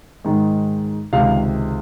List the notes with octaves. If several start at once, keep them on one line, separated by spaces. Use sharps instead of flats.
G#2 D#3 G#3
C#2 C3 D#3 G#3 F5